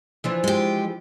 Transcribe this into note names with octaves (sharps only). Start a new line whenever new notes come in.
E3 F3 D4
G#3 G4